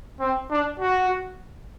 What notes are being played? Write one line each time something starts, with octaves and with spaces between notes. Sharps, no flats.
C4
D4
F#4